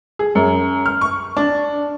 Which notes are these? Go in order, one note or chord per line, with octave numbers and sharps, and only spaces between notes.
G#4
F#2
F6
C#6
D4